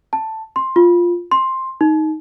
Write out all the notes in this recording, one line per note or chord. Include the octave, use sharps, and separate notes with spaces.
A5
C6
F4
C6
D#4